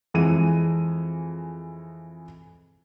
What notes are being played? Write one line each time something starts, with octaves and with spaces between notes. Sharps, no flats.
F2 E3 G#3 D#7